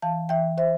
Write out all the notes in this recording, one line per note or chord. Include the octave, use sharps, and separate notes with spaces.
E3 F5 A5
E3 E5 G5
C5 E5